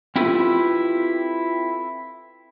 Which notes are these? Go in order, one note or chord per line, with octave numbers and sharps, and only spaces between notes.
C4 E4 F4 G4 A4 B4